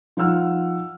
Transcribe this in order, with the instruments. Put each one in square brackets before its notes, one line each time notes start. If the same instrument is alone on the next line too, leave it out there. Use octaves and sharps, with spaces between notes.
[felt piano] F3 D#4 F#5 E6 F6